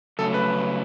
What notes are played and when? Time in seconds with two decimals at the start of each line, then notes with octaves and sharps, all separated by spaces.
0.19 C#3 F#3 A3 C#4 A4
0.34 B4